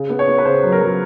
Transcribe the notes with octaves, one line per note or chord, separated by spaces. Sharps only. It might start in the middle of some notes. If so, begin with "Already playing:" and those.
Already playing: C#3
B3
C#5
B3
B4
C#3 C5
F#3
A#4
F#3